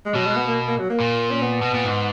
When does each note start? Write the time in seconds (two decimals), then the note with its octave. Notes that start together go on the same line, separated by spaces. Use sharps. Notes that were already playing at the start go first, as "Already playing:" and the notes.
0.06 G#3
0.15 B2 F#3
0.26 G#3
0.36 B3
0.47 A#3
0.68 A#3
0.79 F#3
0.90 A#3
1.00 A#2
1.31 C#4
1.42 B3
1.62 B2
1.74 A#2
1.85 G#2